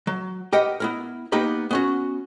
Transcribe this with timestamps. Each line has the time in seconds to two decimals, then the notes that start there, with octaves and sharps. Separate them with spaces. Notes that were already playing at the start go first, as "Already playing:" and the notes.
0.07 F#3
0.53 G4 A#4 B4 D#5 F#5 G5
0.80 B3 E4 A#4
1.32 A#3 B3 D#4 G4 B4
1.71 B3 C#4 F#4